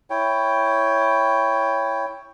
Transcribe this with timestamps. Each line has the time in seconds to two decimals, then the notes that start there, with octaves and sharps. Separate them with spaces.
0.10 E4 C#5 G5